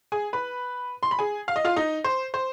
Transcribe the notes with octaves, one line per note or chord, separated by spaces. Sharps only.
G#4 G#5
B4 B5
C6
B5
G#4 G#5
F5
D#5
F4 F5
D#4 D#5
C5
C5